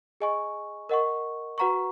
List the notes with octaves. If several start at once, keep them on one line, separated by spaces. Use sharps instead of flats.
G#4 D#5 G#5 C#6
A#4 D#5 F#5 C#6
F#4 B4 F#5 A#5 C#6